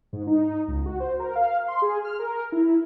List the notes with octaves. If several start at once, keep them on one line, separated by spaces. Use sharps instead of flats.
G#2
D#4
C#2
F#4
C5
A#4
F5
C6
G#4
F6
A#4
E4